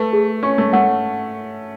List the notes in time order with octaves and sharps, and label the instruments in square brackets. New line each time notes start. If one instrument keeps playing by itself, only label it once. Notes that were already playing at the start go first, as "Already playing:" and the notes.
Already playing: [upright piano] A3 [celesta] B4
[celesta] G#4
[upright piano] C#4 [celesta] C#6
[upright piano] A3
[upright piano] A3 [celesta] F#5